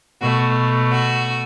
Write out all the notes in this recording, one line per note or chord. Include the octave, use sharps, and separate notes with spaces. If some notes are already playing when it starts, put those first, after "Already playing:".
B2 A3 F#4
F#4